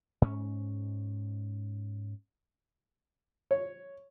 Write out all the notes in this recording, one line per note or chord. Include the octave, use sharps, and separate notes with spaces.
G#2 C#4
C#5